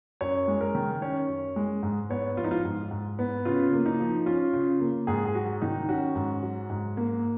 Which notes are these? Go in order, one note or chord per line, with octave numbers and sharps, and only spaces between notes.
F#2 C#5
G#3
A#4
D#3
C#4 C#5
F#2
G#3
G#2
B3 C#5
F3 F4
D#4
F4
G#2
G#2
B3
C#3 F4
A#3
D#4
F3
C#4 F4
C#3
A#3
G#2 G#4
G#4
F#3 F#4
D#3 D#4
C#4 F#4
G#2
F#3
G#2
A#3